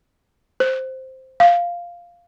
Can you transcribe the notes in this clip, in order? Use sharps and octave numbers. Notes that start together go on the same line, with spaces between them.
C5
F5